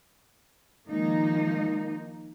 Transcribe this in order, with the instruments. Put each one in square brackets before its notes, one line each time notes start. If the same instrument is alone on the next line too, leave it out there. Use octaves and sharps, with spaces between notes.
[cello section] D#3 F3 G#3 A#3 D#4